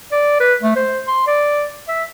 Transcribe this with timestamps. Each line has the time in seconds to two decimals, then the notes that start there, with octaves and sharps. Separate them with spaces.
0.12 D5
0.40 B4
0.63 A3
0.76 C5
1.07 C6
1.27 D5
1.88 E5